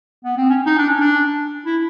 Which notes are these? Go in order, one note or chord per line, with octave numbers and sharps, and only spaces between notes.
B3
C4
C#4
D#4
D4
C#4
D4
E4